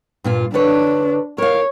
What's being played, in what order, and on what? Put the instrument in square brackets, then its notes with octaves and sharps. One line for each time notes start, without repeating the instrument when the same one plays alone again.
[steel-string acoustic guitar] G2 A#2 F4
[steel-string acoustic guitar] D3 B4 C#5 [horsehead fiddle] D4
[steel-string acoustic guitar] A#4 F5 [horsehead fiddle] C#5